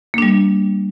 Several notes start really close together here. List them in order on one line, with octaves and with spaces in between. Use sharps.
A#3 D4 G3